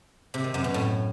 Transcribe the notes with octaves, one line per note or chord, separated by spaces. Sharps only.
C3
D#3
F#2
B2
A2